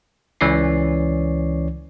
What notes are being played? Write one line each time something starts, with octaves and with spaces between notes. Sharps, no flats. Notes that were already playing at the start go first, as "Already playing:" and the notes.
C#2 E3 C#4 C#5 D5 C7